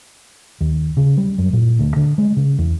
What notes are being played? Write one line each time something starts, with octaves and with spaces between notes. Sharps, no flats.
D#2
C#3
G3
F#2
A#2
D2
D3
G#3
C#3
E2